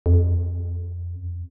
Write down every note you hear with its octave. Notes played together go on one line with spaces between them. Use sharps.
F2
F#2
F2